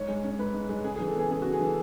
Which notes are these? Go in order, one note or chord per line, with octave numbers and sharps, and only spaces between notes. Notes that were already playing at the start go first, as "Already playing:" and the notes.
Already playing: G#2 C#5
G#3
C#4
G#2 B4
G#2
G#3
C#3 G#4
G#4
E3
A4
B3 G#4
C#3 G#4
F#4
C#3
G#4
E3 A4